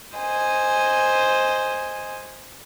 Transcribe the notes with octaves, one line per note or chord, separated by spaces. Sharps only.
C5 D#5 G#5